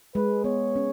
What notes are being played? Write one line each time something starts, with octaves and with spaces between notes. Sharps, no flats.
G#3 B4
B3 C#5
C#4